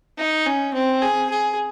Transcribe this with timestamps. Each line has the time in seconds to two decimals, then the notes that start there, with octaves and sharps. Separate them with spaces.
0.18 D#4
0.47 C#4
0.74 C4
1.02 G#4
1.30 G#4